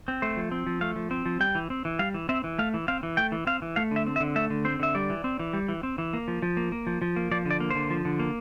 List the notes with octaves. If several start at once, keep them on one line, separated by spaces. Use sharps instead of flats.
C4
A3 C5
F3
C4
F3
A3 F5
F3
C4
F3
G3 G5
E3
C4
E3
G3 F5
E3
C4 E5
E3
A3 F5
E3
C4 F5
E3
A3 G5
E3
C4 F5
E3
A3 F5
D3 E5
C4
E5
D3
A3 E5
D3
C4 C5
D3 E5
G3 D5
E3
C4
E3
G3
E3
C4
E3
A#3
F3
F3
A#3
A#3
F3
F3
A#3
F3 D5
D3 D5
A#3
D3 C5
F3
D3
A#3